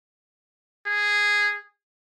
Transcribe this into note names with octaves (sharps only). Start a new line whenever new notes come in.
G#4